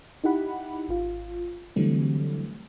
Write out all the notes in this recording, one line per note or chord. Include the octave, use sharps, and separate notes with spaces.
D#4 E4 G4 F#5 B5
G#1 F4
D3 E3 F#3 G3 A3 C4